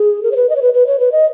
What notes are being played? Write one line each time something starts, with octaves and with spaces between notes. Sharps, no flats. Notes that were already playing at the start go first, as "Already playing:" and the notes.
Already playing: G#4
A#4
C#5
B4
D#5
C#5
B4
B4
C#5
B4
D#5